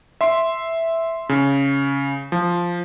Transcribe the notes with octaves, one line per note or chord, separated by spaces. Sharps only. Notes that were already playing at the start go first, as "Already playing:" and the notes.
E5 C6
C#3
F3